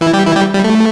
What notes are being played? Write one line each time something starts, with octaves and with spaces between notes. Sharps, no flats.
E3 E4
G3 G4
E3 E4
G3 G4
G3
A3